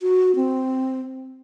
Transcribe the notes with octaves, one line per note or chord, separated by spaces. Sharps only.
F#4
C4